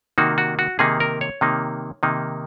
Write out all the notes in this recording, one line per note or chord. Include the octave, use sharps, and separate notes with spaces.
C3 D#3 A#3 D#4 F#4
F#4
F#4
C3 D#3 A#3 D#4 G#4
A#4
C#5
C3 D#3 A#3 D#4
C3 D#3 A#3 D#4